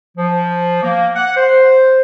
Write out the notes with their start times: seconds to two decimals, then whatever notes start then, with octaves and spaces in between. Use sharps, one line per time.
0.17 F3
0.83 A#3
1.16 F#5
1.37 C5